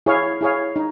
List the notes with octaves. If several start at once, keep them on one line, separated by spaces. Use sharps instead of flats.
E4 G#4 C#5 F5
E4 G#4 C#5 F5
D#4